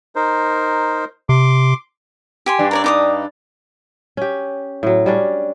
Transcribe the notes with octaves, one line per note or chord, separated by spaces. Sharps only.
D#4 A#4 C5
C3 C6 D6
G4 G#5 C6
G2 D4
A#4 C#5 D5
D#4 D6 D#6
C#4 G4
A2 F#3
G3 C#4 D4